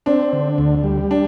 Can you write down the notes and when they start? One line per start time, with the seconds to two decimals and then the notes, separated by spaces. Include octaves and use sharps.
0.06 C4 D4
0.33 D3
0.58 D2
0.84 G3
1.11 D4